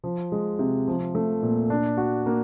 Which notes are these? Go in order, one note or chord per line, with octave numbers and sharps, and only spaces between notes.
F3
G#3
C3
F3
A3
A#2
D4
F#4
A#3